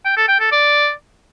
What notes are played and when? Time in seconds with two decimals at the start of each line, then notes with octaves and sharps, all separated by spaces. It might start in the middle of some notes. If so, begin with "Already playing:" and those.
0.05 G5
0.17 A4
0.28 G5
0.40 A4
0.52 D5